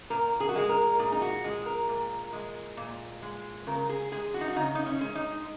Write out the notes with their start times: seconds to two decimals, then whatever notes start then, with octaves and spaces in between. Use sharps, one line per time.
0.10 A#2 A#4
0.40 G#4
0.49 F#4
0.55 G#3 G#4
0.69 A#4
0.99 A#2 G#4
1.12 D#4
1.22 F#4
1.44 G#3 G#4
1.66 A#4
1.89 A#2
2.33 G#3
2.77 A#2
3.22 G#3
3.67 C#3 A#4
3.89 G#4
4.12 G#3 G#4
4.34 F#4
4.41 D#4
4.48 F#4
4.56 C#3 D#4
4.75 D#4
4.86 C#4
5.01 G#3
5.15 D#4